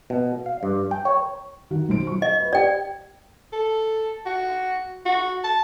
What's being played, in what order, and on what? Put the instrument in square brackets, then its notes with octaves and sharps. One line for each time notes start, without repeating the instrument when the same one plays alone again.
[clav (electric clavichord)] B2
F5
G2
G5
C#5
[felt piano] D#3 F#4
B1 C5 D7
F#3 C#6
[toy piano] D#5
[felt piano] B4
[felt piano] G4 B4 [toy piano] D5 G5
[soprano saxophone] A4
F#4
F#4
A5